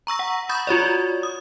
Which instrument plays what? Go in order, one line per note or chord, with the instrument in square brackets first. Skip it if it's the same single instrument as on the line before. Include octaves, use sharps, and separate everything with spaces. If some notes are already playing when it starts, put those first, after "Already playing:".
[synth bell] A#5 C#6 E6 A#6
F#5
B5 C#6 D#6 G6 A6
F4 F#4 C#5 D5
D#6